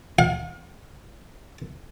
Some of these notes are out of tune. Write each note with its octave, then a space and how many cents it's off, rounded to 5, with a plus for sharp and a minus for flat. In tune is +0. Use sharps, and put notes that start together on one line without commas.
F5 +45